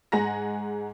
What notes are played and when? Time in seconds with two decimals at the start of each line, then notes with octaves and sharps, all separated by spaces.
0.12 G#2 G#3 F#5 G#5 A#5 A#6